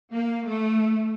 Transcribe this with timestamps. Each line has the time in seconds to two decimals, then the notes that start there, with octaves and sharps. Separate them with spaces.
0.12 A#3
0.47 A3